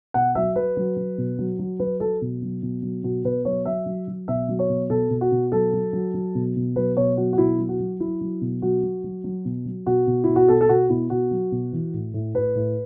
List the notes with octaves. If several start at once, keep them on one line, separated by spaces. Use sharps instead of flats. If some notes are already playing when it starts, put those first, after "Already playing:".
B2 F#5
F#3 E5
F#3 B4
F#3
F#3
B2
F#3
F#3
F#3 B4
F#3 A4
B2
F#3
B2
F#3
B2 F#4
B2 B4
F#3 C#5
F#3 E5
F#3
F#3
B2 E5
F#3
C#5
B2
B2 A4
B2
F#4
B2
F#3 A4
F#3
F#3
F#3
B2
B2
F#3 B4
B2 C#5
F#3 F#4
F#4
B2 E4
F#3
F#4
F#3
F#3 E4
F#3
B2
F#3 F#4
F#3
F#3
F#3
B2
F#3
B2 F#4
B2
B2 E4
F#4
B2 A4
A4
B2 F#4
B2 E4
B2 F#4
F#3
B2
E3
A2
A2
A2 B4
A2